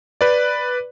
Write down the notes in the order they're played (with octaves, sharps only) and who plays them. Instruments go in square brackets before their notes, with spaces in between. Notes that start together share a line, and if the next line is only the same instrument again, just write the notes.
[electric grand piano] B4 D5